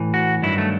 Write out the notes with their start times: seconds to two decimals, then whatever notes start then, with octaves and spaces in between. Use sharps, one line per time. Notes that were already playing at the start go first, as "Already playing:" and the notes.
Already playing: A2 E3
0.14 F#4
0.42 G2 D#3 F#3 E4
0.58 A3